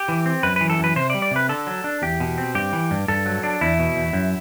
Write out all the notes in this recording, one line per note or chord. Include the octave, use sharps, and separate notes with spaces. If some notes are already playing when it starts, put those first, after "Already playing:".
Already playing: G4
E3
C4
F#2 B4
E3 B4
A4
F#2 B4
C3 C5
D5
G3
D5
C3 B4
D3 A4
F#3
D4
E2 G4
B2
C4
G2 G4
E3
G2
G2 A4
F#3
D4
E2 E4
B2
E2
F#2